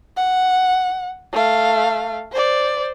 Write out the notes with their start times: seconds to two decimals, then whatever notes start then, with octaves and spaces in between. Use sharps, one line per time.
0.17 F#5
1.33 A3 F5
2.32 C5 D5